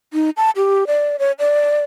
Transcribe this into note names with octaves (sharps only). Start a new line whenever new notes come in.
D#4
A5
G4
D5
C#5
D5